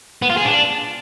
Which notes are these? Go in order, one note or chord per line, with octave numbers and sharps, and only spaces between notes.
B3
F4
G#4
D4